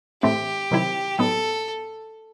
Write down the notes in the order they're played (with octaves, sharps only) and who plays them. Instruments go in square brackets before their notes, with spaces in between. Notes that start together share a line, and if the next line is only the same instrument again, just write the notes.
[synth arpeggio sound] A2 E3 A3 C4 [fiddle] G4
[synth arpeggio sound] C3 D#3 F#3 C4 E4
[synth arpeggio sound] A2 F#3 B3 D#4 [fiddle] A4